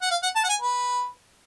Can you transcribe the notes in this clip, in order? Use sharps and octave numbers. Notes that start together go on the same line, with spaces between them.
F#5
F5
F#5
A5
F#5
G#5
B4